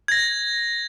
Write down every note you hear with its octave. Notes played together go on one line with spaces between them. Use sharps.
G#6 A#6